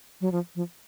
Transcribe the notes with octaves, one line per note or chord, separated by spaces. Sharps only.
F#3
F3
F3